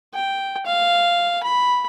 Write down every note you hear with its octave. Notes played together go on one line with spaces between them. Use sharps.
G5
F5
B5